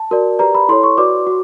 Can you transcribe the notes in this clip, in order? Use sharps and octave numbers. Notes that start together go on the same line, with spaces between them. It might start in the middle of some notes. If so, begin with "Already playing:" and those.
Already playing: A5
F#4 A#4 D5
G4 B4 D5 A#5
B5
E4 A4 C#5 C6
C#6
F#4 B4 D5 D6
F#4